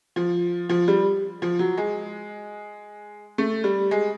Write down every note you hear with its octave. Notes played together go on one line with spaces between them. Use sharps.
F3
F3
G3
F3
F#3
G#3
A3
G3
G#3